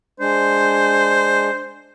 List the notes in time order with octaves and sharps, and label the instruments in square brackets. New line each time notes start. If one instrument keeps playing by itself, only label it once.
[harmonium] G#3 D4 [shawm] C5